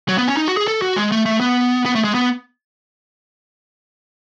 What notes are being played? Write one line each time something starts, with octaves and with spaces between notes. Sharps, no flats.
F#3
B3
C#4
D#4
F#4
G#4
A4
F#4
G#3
A3
A3
B3
B3
A3
G#3
B3